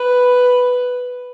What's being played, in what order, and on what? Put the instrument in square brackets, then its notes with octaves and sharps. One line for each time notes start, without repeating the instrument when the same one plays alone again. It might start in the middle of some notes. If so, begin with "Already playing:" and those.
Already playing: [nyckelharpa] B4